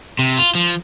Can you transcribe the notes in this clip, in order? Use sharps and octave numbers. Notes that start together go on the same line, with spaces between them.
C3
F4
F3